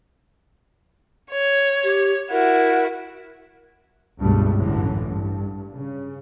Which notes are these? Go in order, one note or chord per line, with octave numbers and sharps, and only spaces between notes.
C#5
G4
E4 F#4 A#4
C#2 G2 B2 G3 A3
A1 F#2 A2 D3 E3
G2
C#3